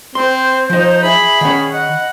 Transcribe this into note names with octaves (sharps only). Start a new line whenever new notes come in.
C4 C5 C6
F3 D#4 D#5
G#4 E5 B5
D#3 C#4 F#5
D#5 F#5